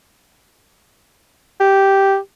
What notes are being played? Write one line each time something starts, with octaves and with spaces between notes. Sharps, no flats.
G4